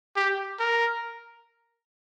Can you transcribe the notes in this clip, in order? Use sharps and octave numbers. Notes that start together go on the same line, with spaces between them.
G4
A#4